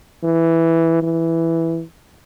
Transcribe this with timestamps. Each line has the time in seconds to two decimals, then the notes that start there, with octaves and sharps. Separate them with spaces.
0.24 E3
1.03 E3